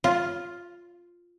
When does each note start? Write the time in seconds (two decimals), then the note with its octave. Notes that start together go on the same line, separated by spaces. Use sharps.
0.04 F4